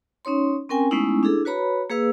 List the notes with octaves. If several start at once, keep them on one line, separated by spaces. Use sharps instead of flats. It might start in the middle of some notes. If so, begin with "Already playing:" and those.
C#4 D#4 C#5 C6
C4 C#4 A#4 G5 G#5
G#3 A3 B3 C#4 D#4 E4
D4 E4 G#4 A4
F#4 B4 C#5 A#5 B5
A#3 G#4 B4 F5 E6